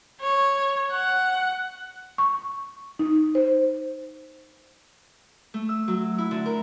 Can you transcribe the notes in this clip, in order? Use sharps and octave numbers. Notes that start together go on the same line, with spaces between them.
C#5
F#5
C#6
D#4
C5
A3
E6
F#3
E4
D3
A#4